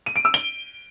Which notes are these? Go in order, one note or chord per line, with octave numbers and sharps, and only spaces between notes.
D#7
D7
E6
G7